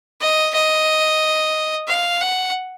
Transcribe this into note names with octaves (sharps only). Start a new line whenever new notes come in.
D#5
D#5
F5
F#5